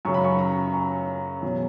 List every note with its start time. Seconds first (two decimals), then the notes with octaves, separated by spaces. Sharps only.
0.05 F#2 C#3 F#3 C#6
0.14 B5
0.24 C#6
0.39 A#5
0.74 A#5
1.42 E2 B2 F#3